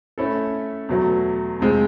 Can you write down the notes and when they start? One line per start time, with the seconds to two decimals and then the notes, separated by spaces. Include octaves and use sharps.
0.18 A3 C#4 E4 A4
0.89 E2 B2 F#3 A3
1.60 F2 C3 F3 G#3 C4